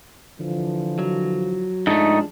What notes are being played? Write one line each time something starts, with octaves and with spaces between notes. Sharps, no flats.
D3 E3 F3
F#3
G#2 F3 G#3 A3 D4 D#4